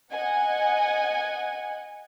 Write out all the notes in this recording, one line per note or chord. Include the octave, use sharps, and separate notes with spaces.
D#5 F#5 G#5